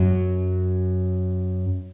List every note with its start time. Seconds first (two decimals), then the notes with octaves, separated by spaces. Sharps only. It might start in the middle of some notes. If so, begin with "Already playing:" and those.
Already playing: F#2 F#3